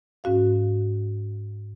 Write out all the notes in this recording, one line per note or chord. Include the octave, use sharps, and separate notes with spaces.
G#2 C#4 F#4 F5